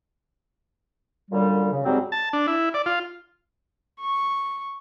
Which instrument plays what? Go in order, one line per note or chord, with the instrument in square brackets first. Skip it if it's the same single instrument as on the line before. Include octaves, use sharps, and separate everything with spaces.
[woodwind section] F#2 A#2 D3 G3
C#3
G#2 F#3 G3 C4
[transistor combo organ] A5
D4
E4
D5
F4
[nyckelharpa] C#6